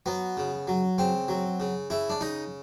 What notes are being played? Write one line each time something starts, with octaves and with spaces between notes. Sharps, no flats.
F#3 B3
C#3
F#3
C#3 C4
F#3
C#3
C#3 E4
D4
C#3 D#4